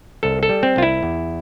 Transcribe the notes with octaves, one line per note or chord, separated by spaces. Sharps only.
C2 A4
A4
G3
C4
C2 F4
E4
E2